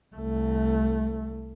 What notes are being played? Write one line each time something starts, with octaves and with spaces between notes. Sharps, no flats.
C2 A3